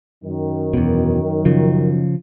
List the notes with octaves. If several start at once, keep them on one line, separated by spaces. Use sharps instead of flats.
F#2 D#3
E2 B2
C#3 F3